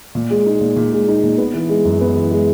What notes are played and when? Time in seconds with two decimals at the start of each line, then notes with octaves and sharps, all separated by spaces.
0.15 A#2
0.31 G#3
0.46 D#4
0.61 A#2
0.76 A#2
0.93 G#3
1.08 D#4
1.23 A#2
1.38 B3
1.54 E3
1.69 G#3
1.85 F#2
2.01 B3
2.16 E3
2.32 G#3